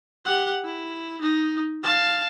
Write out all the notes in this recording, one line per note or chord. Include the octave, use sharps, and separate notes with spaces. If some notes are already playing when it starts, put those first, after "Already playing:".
G4 F#5
E4
D#4
F5 A5